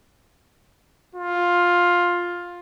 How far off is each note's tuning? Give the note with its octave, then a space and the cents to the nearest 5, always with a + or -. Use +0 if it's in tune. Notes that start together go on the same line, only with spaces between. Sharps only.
F4 +10